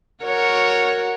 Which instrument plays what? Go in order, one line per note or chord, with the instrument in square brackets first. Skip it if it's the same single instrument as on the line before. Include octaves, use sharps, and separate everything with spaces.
[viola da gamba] F#4 A#4 C#5